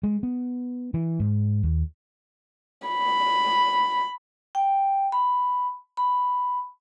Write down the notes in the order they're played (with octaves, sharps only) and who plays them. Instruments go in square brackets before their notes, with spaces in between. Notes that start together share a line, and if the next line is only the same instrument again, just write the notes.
[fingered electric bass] G#3
B3
E3
G#2
D#2
[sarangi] B5
[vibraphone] G5
B5
B5